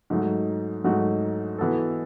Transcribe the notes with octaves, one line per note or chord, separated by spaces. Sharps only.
G#2 F#3 A3 D#4 F#4
G#2 F#3 A3 D#4 F#4
E3 B3 F#4 A4